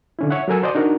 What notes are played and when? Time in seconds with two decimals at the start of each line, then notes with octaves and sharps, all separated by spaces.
0.19 D3 C#4 E4
0.30 C#5 E5 F#5
0.48 F#3 A4 A#4 G#5 E6
0.63 F#4 C5 D5 D#5
0.75 D4 D#4 F#4 A#4